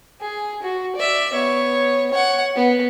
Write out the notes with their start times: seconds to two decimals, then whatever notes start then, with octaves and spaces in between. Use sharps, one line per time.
0.21 G#4
0.62 F#4
0.96 D5 E5
1.33 B3 C#5
2.11 C#5 F#5
2.56 B3